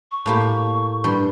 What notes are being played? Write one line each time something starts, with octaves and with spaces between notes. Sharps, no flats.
C#6
A2 A#3 G4
G2 G3 C6